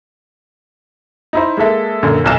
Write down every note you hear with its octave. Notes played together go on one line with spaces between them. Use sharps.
D#4 E4 C5
G#3 A#3 A4 E5
F#2 A#2 D3
F1 B1 E7